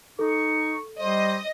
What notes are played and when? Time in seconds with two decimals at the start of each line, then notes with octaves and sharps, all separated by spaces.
0.19 D#4 A4 C#6
1.00 G3 C5 D#5